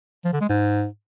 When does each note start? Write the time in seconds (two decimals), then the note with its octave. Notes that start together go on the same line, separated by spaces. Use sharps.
0.25 F3
0.33 D3
0.41 G#3
0.49 G#2